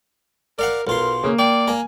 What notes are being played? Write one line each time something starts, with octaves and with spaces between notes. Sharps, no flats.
A#4 D5 F5 F#5
B1 F4 A#4 C6
C#3 A#3
D5 G5
A#3 A#4 G#5